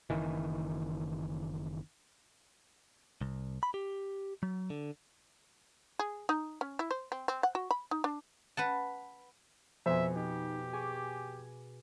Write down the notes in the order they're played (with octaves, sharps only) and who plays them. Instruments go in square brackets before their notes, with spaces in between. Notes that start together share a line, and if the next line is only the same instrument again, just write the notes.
[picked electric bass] F#1 D#3 E3
[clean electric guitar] C2
B5
G4
F#3
D3
[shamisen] G#4
D#4
C#4
E4
C5
C4
C4
F#5
F#4
B5
D#4
D4
[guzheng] B4 F#5 A5
[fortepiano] F2 [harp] B2 G#5 [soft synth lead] C5 [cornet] E5
[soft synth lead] D#4 [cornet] G4
[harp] G#4 C#6 D6 [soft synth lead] G#5